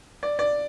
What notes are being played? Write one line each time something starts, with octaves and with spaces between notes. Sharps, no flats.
D5
D5